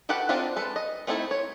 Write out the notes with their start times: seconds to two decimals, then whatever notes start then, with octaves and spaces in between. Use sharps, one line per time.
0.09 F#4 G4 A4 B4 F#5
0.29 C4 D4 D#4 F4 E5
0.56 G#3 A4 B4
0.76 D#5
1.07 A3 C4 D#4 E4 A4
1.31 C#5